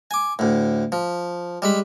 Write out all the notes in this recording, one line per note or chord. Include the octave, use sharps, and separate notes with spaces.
G#5 D6
D2 A2
F3
G3 G#3 B5